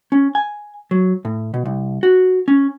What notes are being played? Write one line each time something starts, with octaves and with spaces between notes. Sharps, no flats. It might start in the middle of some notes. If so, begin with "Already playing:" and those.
C#4
G#5
F#3
A2
B2
C2
F#4
C#4